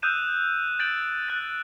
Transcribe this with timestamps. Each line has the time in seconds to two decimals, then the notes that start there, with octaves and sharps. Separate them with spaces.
0.02 D#6 E6 F#6 G6 D#7 E7
0.79 G6 A6 D7 F#7
1.28 F#6 A6